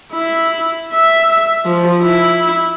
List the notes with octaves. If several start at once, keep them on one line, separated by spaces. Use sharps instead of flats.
E4
E5
F3
E4